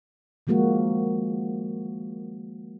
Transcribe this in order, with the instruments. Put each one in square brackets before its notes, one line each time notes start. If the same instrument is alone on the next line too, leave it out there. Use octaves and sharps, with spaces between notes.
[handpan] D#3 F3 G#3 A#3 F#4